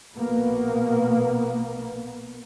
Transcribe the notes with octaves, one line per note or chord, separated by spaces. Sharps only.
A#1 B2 A#3 B3